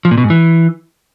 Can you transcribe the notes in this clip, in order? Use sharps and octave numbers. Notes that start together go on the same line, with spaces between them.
F3
A#2
B2
G#2
E3